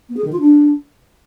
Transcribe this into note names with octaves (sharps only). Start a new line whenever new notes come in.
B3
G#4
D#3
F4
D4